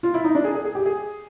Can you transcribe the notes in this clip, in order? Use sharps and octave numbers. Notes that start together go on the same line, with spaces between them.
F4
E4
D#4
D4
G#4
G#4
G#4
G4
G#4